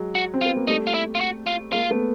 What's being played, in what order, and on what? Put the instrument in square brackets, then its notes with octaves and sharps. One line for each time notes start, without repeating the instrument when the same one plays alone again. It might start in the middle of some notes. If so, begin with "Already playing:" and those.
Already playing: [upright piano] F#3 G#3
[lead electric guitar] F#4
[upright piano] C4
[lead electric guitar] F4
[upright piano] B3
A#3
[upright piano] G3 A3 [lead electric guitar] D#4
[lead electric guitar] F4
E4
F4
F#4
F4
[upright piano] G#3 A#3 [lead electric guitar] F4
[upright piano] A3 B3